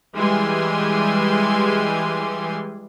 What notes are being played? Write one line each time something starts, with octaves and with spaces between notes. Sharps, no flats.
E3 G3 G#3 G4 G#5 C6